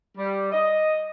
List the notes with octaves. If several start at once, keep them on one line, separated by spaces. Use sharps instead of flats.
G3
D#5